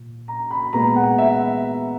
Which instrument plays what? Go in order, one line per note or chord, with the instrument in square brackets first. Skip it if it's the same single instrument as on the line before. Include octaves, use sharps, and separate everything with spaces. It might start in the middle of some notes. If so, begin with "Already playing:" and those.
Already playing: [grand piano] A#2
A#5
B5
A#2 G#3 B3 A#5
F#5
E5